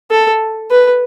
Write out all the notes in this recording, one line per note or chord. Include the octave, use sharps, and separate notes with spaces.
A4
B4